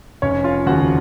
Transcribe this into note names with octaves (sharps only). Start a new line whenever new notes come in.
F1 C#4 C#5
F4 F5
D#2 C#3 F3 F#4 F#5